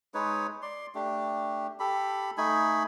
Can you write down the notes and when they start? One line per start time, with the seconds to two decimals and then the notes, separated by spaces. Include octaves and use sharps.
0.14 G#3 D#4 B4 C#5
0.62 D5 C6
0.95 A3 D4 G4
1.80 G4 A4 B5
2.38 A3 D#4 G#5 B5